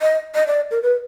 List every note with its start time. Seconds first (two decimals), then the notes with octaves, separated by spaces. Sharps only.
0.02 D#5
0.35 D#5
0.47 D5
0.71 A#4
0.83 B4